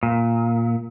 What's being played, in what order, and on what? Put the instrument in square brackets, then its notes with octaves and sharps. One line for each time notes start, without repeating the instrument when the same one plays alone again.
[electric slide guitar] A#2